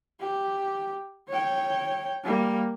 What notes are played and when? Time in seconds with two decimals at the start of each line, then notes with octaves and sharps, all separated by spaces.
0.20 G4
1.29 C#5 G5
2.24 G3 A#3